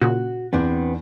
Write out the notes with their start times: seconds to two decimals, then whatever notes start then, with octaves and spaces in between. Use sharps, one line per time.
0.02 A#2 C#3 F#4
0.53 E2 B3 C4 D4